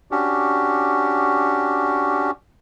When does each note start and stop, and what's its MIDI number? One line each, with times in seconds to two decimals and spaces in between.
0.11 2.31 61
0.11 2.31 62
0.11 2.31 66
0.11 2.31 67